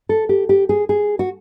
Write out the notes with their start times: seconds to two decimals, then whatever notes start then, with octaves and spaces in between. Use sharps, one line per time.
0.09 A4
0.29 G4
0.49 G4
0.69 G#4
0.89 G#4
1.19 F#4